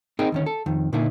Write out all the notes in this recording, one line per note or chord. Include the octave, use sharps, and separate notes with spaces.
C4 D#4 G#4 A#4 D#5 G5
D2 D#3 C#4
A4
F2 D#3
A#2 D3 A#3 D#4 E4